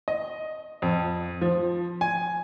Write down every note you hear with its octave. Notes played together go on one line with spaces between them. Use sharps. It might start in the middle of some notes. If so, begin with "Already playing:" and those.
D#5
F2
F3
G#5